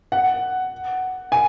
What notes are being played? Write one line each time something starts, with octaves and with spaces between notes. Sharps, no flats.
F#5
G#5